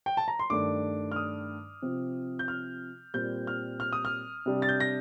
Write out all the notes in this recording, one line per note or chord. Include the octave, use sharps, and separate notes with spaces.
G5
A5
A#5
C6
G2 D#3 A3 D4 D6
F6
D#6
C3 F3 C4
G6
F6
A#2 G3 C4 G6
F6
F6
D#6
F6
C3 G3 D4
A6
G6
A#6